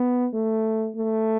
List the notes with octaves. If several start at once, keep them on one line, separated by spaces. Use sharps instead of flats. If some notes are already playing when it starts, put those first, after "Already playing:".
Already playing: B3
A3
A3